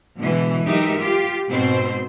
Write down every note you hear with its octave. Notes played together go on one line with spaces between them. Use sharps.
B2 D3 E3 G#3
F#3 G#3 D#4 G4 A#4 E5
F4 G4
G#2 B2 C4 C5